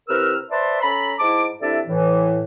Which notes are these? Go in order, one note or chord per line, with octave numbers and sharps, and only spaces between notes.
C3 E4 A#4 B4 E6 F6
B4 C5 D5 E5 A5 C6
C#4 A4 A#5 B5
G#2 E4 A5 D6
C3 D4 E4 A4 D5 E5
A2 E3